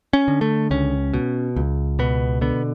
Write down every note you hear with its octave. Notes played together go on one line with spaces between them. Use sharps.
C#4
D3
A3
C#2 C#4
B2
C#2
B2 B3
D3 B3